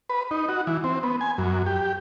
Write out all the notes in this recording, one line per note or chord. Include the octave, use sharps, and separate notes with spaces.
B4
D#4
F#4
E3
C4
B3
G#5
F#2
G4